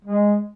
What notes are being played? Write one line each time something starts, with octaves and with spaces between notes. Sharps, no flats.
G#3